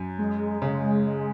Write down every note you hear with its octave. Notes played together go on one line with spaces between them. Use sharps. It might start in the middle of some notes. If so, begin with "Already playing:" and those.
Already playing: F#2
G#3
C#3 G#3